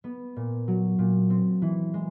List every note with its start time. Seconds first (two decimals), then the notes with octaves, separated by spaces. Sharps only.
0.04 B3
0.36 A#2
0.68 F#3
0.99 A#2
1.30 C4
1.62 E3
1.94 G#3